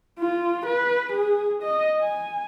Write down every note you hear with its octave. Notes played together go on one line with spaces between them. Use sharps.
F4
B4
G#4
D#5
G#5